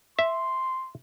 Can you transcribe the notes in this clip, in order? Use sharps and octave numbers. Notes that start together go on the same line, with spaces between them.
E5 C6